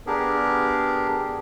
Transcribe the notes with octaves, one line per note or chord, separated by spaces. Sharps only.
B3 D4 G4 G#4 A#4